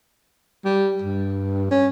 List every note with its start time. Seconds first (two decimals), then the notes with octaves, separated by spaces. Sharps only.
0.65 G3
1.02 G2
1.71 C#4